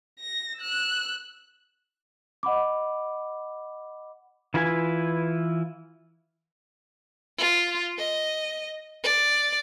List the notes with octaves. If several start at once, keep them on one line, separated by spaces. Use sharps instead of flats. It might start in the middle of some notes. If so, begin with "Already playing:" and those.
A#6
E6 F#6
D#5 F#5 B5 D6
E3 E4 F4 B4 G#5
F4
D#5
D5